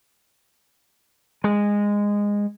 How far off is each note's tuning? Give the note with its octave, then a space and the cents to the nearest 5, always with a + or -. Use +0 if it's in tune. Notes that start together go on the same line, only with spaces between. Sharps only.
G#3 -15